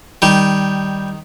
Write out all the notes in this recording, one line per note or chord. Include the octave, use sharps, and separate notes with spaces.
D#3 G3